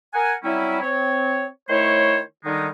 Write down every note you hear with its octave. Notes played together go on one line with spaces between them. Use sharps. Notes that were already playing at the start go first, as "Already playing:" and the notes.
A#4 F#5 G#5
F#3 G3 C4 C#4 E4
C4 C#5
D#3 A3 E4 C5 C#5
D3 D#3 G3 G#3 D#4